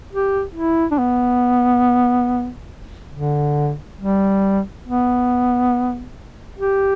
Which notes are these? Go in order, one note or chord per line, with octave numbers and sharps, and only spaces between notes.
G4
E4
D4
B3
D3
G3
B3
G4